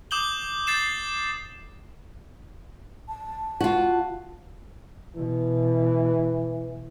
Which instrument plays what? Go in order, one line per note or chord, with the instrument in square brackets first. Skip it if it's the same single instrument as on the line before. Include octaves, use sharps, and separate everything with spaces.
[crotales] D6 D#6 G6 F#7 G7
G6 A6 C7 E7
[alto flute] A5
[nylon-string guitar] F4 F#4
[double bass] B2 [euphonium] E3